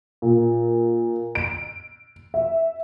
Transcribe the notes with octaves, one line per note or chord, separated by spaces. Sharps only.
A#2
D7
E5